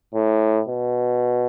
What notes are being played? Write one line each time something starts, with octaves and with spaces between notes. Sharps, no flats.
A2
B2